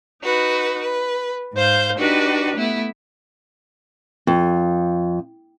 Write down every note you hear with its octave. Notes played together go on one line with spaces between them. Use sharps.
D#4 F#4 B4
B4
G#2 C5 F5 G6
D4 D#4 F#4 G4 B4
A3 B3 E4
F2